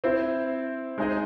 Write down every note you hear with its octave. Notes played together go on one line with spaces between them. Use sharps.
C4 E4 C5
G#3 D#4 G#4 C5 D#5